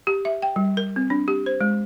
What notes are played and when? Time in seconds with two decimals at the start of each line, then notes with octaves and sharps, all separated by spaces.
0.07 G4
0.25 E5
0.42 G5
0.56 G3
0.77 A#4
0.96 C4
1.10 D4
1.28 G4
1.46 C5
1.61 G#3